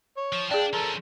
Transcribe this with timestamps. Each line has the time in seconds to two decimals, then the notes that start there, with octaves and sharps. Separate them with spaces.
0.17 C#5
0.33 F3
0.51 D4 G#4 D5 F5 G5 A5
0.73 F3 C#4 A4 A#4